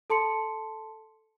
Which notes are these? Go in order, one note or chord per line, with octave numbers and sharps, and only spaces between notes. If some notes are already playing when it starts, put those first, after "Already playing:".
A4 A5 C6 C#7